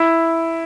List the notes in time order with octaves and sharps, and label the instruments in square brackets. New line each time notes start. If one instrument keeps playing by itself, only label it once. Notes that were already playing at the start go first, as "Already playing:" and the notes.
Already playing: [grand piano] E4